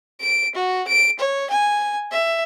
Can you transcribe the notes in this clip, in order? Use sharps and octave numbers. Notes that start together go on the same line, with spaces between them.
D7
F#4
D7
C#5
G#5
E5